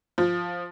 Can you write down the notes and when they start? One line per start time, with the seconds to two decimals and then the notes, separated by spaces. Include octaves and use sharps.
0.18 F3